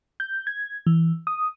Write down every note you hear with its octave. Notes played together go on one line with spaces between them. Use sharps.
G6
G#6
E3
D#6